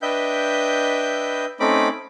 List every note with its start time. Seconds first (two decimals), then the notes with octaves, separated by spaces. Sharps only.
0.02 D4 B4 D#5 E5 G5 G6
1.60 A3 C4 C#4 D#4 B5 D6